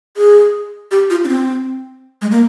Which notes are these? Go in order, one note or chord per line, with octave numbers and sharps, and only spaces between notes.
G#4
G4
F4
D4
C4
G#3
A#3